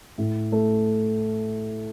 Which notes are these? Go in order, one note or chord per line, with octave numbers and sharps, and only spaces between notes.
A2
A3